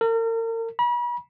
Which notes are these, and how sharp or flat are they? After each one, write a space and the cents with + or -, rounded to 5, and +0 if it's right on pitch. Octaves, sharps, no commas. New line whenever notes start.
A#4 -40
B5 -40